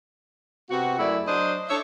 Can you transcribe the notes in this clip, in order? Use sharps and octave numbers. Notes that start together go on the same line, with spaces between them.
C3 B3 F#4
F#2 A3 E4 G#4 D5
F#3 D4 C5 D#5
D4 A4 C#5 E5